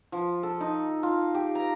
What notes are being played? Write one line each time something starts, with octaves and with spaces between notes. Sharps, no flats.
F3
A4
D#4
F4
G4
A#5